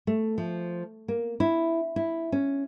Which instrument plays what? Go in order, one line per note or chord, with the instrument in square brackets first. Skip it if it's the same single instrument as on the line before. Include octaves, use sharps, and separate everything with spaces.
[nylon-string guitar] A3
F3
A#3
E4
E4
C#4